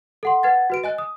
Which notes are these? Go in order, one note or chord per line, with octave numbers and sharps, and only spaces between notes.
A4 F#5 C6
B4 F#5 G#6 A6
F#4 B4 D7
D#5 G#5 F#6
D#6